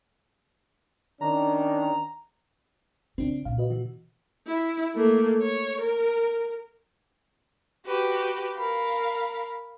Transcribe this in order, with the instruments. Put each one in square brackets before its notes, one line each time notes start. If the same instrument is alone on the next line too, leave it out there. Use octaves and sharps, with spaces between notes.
[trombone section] D#3 C#4 D4 [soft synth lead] A#5
[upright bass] C#3 [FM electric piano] C4 D4
[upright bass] A#2 C#3 [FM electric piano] F5
[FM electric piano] F#4 B4 D#5
E3 F#4
[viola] E4
A3 A#3
C#5
A#4
[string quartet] F#4 G4 B4
A#4 F5 B5